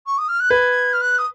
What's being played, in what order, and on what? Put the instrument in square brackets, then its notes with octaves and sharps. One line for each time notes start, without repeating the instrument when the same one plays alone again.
[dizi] C#6
D#6
F6
F#6
[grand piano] B4 [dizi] G#6
[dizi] F6
F#6
D#6